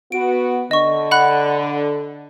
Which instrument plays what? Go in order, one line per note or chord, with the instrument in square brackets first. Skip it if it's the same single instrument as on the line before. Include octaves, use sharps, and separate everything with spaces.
[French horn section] B3 F#4 [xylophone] D7
[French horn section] D3 [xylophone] D#5 C#6
[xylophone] F#5 B5 F#6